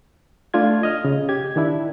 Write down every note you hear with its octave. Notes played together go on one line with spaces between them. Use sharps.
A3 D4 F4 G#6
D#5 F6
C#3
G4 G#6
D#3 D4 E4